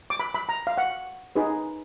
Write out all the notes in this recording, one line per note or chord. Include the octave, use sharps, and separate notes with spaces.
D6
B5
B5
A#5
F5
F#5
D#4 G#4 B4